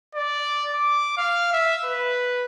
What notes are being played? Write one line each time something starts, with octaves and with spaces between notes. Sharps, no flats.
D5
D6
F5
E5
B4